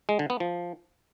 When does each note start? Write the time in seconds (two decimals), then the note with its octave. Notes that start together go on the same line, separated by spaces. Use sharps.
0.09 G#3
0.19 D3
0.30 B3
0.40 F3